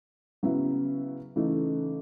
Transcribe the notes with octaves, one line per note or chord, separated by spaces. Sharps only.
C#3 F#3 B3 E4
C#3 E3 A3 D#4